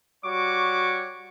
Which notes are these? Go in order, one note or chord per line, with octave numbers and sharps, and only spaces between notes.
G3 F#4 C#5 C#6 D6